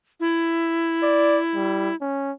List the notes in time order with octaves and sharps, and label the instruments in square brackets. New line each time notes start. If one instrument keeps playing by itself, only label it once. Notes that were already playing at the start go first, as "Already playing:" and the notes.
[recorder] E4
[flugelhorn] D5
G3
C#4